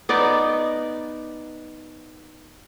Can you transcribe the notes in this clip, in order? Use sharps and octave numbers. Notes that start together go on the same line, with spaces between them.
B3 D#4 D5